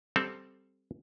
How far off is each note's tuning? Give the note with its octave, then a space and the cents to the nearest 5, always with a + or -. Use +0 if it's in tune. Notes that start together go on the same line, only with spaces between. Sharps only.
G3 +0 C4 +0 A4 +0